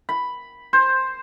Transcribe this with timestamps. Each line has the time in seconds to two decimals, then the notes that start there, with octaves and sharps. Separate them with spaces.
0.09 B5
0.73 C5